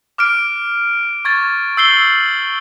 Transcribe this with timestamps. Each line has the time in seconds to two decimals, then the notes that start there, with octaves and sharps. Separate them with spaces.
0.18 D6 F6 F#6 D7
1.25 C#6 G#6 A6
1.77 E6 G6 C7 F#7 G7